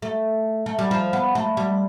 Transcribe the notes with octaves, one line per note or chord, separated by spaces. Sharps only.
A3
A3
G3
F3
B3
A3
G3